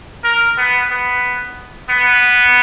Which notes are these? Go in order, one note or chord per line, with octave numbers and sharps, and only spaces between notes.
A#4
B3
B3
B3